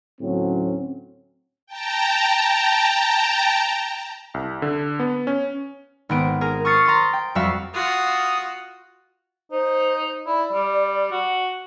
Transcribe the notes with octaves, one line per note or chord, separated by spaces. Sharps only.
D2 A2 D3 F#3 C4 C#4
G5 A5 A#5
C2
D3
B3
C#4
G#1 B3 D7
G#4 A#4
C#6 D#6 F6 A6 C7 C#7
A#5 C6 D#6 A6
G5
F2 G3 F#4 E5 F5
F4 F#4 D#6
D#4 C5
E4 D5
G3
F#4